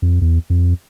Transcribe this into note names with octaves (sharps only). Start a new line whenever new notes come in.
F2
E2
F2